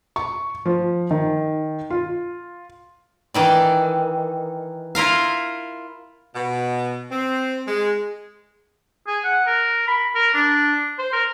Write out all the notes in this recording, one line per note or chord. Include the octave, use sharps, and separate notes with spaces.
C#6
F3
D#3
F4
D#3 E3 D5
E4 F4 A#4 F5
B2
C4
G#3
G#4
F#5
A#4
B5
A#4
D4
C5
A#4